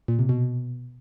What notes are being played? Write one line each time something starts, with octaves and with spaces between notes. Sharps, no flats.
A#2
C3
B2